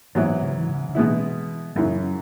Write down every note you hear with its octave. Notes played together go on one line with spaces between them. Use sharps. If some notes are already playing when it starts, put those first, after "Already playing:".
G#2 E3 F#3 B3 E4
C#3
E3
C#3
C#3
B2 E3 G#3 B3 E4
F#2 C#3 E3 F#3